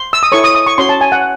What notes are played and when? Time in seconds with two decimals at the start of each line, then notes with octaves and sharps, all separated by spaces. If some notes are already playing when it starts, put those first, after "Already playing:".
Already playing: C6
0.13 E6
0.23 D#6
0.32 E4 A4 C#5 C#6
0.44 D#6
0.55 D#6
0.67 C#6
0.78 C#4 F#4 C#5 C6
0.89 A5
1.01 G#5
1.12 F#5